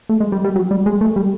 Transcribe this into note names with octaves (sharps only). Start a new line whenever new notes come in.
A3
G#3
G3
G3
F#3
G3
G#3
A3
G3